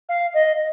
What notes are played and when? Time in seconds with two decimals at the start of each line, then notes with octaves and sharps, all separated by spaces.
0.08 F5
0.34 D#5